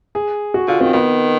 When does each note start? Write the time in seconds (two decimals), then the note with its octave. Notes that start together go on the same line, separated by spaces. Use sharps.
0.15 G#4
0.54 F#4
0.68 D3 F4
0.80 D#3 C4
0.93 D#3 B3